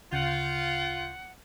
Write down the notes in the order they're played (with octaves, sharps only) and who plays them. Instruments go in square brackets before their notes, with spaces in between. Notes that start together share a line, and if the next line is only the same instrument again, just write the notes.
[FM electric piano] D2 C#3 G6 [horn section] F4 [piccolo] F#5